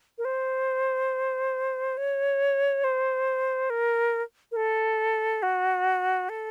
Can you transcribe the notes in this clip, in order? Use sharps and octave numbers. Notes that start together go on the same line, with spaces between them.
A#4
C5
C#5
C5
A#4
A#4
A4
F#4
A4